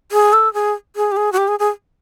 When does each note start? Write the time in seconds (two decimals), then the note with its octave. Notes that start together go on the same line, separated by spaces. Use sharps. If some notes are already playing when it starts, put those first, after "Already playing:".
0.12 G#4
0.33 A4
0.54 G#4
0.96 G#4
1.11 G4
1.17 G#4
1.32 F#4
1.37 G4
1.48 G#4
1.59 G#4